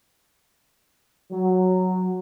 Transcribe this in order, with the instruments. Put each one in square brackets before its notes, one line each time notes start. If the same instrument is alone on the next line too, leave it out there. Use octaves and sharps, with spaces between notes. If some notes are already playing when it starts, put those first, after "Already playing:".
[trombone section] F#3